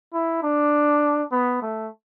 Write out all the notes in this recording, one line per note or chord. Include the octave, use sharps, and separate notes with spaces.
E4
D4
B3
A3